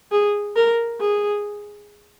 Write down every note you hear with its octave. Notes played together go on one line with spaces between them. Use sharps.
G#4
A#4
G#4